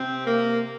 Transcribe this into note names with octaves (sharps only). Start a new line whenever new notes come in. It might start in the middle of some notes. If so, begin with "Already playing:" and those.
Already playing: C3 C4
A#3